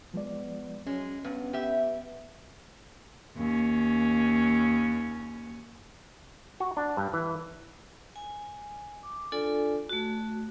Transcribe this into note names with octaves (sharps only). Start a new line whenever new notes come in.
F3 G#3 B3 D5
F#3 G#3 C#4
G2 B3
G4 E5
D#2 C#4
F#4
D4
G2
E3
G#5
D6
D4 F4 A4 D5 G#5
A3 F#4